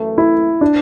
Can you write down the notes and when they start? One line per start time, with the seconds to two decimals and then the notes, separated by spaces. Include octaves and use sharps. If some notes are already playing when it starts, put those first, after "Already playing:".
Already playing: F#2 E3 A3
0.18 E4
0.61 D4